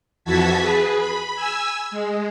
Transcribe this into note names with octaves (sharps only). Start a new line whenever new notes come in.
F2 E3 F#4 A5 G#6 B6
G#4 B4
B5
G#5 E6
G#3